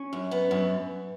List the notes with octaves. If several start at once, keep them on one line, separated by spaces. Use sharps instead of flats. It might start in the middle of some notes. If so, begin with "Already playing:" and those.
Already playing: C#4
F#2
B3
F#2